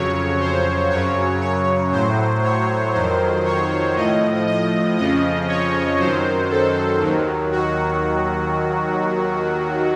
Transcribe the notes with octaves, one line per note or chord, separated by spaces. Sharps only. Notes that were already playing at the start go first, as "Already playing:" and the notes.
Already playing: F2 C#3 F#3 C#5
C5
F#2 C#3 F#3 C#5
C#5
A2 F#3 C5
C#5
F2 D#3 F#3 C5
C#5
A2 F3 D#5
D#5
F2 C#3 F3 D#5
C#5
F#2 D#3 F#3 C5
A4
D#2 D#3 F#3
F#4